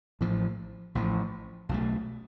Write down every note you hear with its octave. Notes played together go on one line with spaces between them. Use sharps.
A1 A2 F3
A1 A2 F3
B1 B2 A3